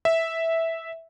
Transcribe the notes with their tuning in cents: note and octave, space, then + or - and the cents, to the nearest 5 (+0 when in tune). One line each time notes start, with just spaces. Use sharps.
E5 -10